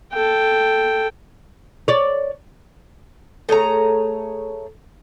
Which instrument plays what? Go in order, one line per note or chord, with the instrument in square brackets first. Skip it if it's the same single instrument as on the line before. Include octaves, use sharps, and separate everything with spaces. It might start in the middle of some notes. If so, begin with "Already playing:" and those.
[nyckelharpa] A4 G5
[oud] C#5 D5
[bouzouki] A3 G#4 C#5 A#5